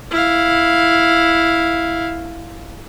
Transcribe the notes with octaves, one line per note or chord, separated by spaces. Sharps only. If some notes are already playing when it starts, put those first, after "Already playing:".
E4 F5